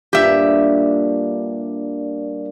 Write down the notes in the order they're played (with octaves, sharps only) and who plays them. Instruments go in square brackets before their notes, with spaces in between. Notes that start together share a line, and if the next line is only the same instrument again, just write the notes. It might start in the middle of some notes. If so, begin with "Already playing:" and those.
[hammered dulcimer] G2 A#2 D4 [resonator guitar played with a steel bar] G4 E5